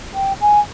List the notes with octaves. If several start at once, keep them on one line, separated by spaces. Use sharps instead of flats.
G5
G#5